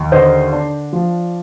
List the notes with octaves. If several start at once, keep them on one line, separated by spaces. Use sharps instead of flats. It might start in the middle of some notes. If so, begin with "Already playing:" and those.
Already playing: D#2
D3 C5 D#5
D4
F3